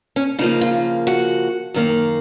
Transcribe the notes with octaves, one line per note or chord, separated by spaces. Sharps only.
C#4
C#3 F3 A#3 D#4
F4
F#4
F#2 D#3 A#3